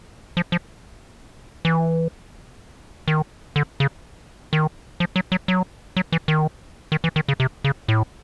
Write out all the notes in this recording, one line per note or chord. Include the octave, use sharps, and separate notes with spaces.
F3
F3
E3
D#3
D3
C#3
D#3
F3
F#3
F#3
F#3
F#3
E3
D#3
D#3
E3
D#3
C#3
C3
C#3
A2